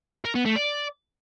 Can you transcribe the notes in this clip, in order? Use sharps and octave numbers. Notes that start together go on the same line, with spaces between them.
A#4
B3
A3
D5